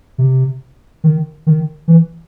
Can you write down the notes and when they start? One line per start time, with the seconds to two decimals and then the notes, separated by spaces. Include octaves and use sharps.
0.18 C3
1.04 D#3
1.47 D#3
1.88 E3